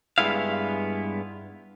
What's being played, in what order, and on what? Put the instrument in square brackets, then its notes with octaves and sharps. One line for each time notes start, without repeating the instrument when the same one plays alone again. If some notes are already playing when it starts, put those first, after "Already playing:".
[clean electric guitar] G2 C3 G#3 B3 E4 F5